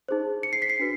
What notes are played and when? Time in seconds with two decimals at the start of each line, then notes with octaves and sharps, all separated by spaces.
0.09 D#4 G#4 C5
0.43 C#7
0.53 C7
0.62 B6
0.70 C7
0.80 D4 F#4 B4